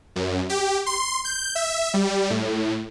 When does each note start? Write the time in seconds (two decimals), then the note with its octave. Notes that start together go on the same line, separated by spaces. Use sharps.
0.16 F#2
0.49 G4
0.86 C6
1.25 G6
1.55 E5
1.94 G3
2.30 A2